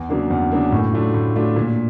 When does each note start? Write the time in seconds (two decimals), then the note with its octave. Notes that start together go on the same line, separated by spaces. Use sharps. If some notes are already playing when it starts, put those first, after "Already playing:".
Already playing: E2
0.09 C#3 F#3 A#3 D4
0.30 E2
0.52 C#3 F#3 A#3 D4
0.72 A2
0.93 F#3 A3 D4 F4
1.14 A2
1.36 F#3 A3 D4 F4
1.56 A#2